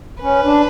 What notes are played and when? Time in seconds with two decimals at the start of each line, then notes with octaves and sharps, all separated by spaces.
0.22 C#4 B4
0.43 D4